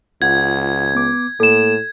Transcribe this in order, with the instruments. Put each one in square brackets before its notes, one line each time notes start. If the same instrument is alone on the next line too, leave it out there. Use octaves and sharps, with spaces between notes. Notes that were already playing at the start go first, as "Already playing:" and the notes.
[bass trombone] C#2 [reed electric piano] F4 F#5 [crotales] G#6
[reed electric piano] B3 D6
[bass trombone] A2 [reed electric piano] A#3 [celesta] A4 E7